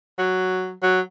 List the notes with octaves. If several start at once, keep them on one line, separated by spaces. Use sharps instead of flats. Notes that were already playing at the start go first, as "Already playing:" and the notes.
F#3
F#3